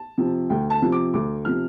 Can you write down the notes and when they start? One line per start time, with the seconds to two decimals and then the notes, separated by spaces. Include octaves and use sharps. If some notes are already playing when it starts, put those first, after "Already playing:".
Already playing: A5
0.18 C3 F3
0.50 D2 G5
0.70 A5
0.82 C3 F3
0.92 D6
1.14 D2 D6
1.45 C3 F3 F6